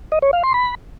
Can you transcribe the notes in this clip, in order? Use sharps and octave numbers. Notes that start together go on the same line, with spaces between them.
D#5
C#5
F5
C6
B5